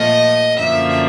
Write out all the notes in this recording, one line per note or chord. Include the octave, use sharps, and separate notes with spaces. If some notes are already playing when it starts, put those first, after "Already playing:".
Already playing: A#2 F3 A3 D#5
F#2 D3 F3 A#3 E5